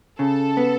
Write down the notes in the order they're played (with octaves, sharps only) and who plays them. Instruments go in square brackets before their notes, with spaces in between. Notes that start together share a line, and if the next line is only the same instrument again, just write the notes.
[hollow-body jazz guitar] C#3 [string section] A4
[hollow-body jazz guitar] B3